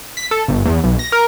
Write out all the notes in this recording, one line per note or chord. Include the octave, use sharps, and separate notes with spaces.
B6
A4
G1
E2
B1
A#6
A#4